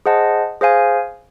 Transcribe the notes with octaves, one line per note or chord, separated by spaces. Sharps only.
G#4 C5 D#5 F#5 A5
G#4 C5 F5 G#5